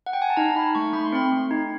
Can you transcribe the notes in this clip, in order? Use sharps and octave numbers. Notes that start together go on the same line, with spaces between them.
F#5
G5
G#5
A5
D#4 A#5
D#4 B5
A3 C#6
A3 B5
C6
C4 B5
A3
D#4